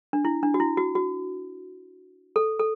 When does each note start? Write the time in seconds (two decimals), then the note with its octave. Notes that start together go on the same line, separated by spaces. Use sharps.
0.13 D4
0.25 E4
0.43 D4
0.54 F#4
0.60 E4
0.77 F#4
0.95 F#4
2.36 A4
2.59 A4